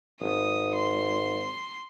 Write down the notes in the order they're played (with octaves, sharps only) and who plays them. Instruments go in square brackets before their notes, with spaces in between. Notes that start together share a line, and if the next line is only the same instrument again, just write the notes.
[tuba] G#1 [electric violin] D#6
[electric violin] C6